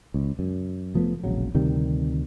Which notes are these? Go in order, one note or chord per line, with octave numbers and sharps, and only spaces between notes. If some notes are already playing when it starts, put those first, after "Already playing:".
C#2
F#2
F1 F3 A3 B3
E1 A#1 C#3 F#3
D2 C3 D#3 G3